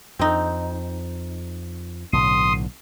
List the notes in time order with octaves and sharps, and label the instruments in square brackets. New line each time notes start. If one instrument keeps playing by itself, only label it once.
[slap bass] F2 [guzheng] C4 D#4
[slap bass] B1 A2 D3 [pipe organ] C6 D#6